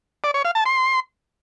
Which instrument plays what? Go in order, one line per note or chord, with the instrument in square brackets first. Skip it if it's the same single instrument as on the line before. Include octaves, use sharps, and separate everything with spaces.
[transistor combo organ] D5
C#5
F5
A5
C6